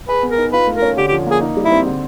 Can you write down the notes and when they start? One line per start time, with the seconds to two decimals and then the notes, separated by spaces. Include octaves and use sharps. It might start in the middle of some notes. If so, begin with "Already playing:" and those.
0.08 G#4 B4
0.23 B3
0.30 A#4
0.38 D#4
0.53 F4 B4
0.67 A3
0.75 A#4
0.82 C#4
0.97 D3 G4
1.08 G4
1.12 F3
1.27 A#3 G#4
1.41 D#4
1.57 G3
1.64 E4
1.72 C4
1.86 D3